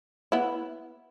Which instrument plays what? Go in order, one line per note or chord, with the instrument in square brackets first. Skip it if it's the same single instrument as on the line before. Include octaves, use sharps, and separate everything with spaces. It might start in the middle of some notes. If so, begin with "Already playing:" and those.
[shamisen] B3 E4